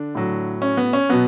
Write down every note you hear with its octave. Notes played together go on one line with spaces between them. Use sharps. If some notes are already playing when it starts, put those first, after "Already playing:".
Already playing: D3 D4
A2 F#3
C#4
B3
C#4
B2 F#3 B3